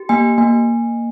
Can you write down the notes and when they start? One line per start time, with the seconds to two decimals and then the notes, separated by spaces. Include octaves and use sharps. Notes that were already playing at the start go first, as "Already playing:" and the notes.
Already playing: G4
0.09 A#3 G#5
0.38 A#3 G#5